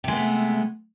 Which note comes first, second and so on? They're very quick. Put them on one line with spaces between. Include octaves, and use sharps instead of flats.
C3 G#3 B3 A3